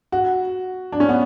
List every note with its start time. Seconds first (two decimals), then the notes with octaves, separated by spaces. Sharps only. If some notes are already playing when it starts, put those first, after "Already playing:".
0.12 F#4
0.92 D4
1.00 C#4
1.09 B3